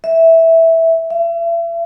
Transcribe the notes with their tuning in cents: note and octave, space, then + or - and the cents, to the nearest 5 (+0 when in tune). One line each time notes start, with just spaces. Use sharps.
E5 -5
E5 +40